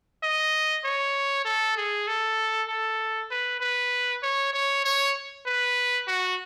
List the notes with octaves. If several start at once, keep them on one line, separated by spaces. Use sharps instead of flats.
D#5
C#5
A4
G#4
A4
A4
B4
B4
C#5
C#5
C#5
B4
F#4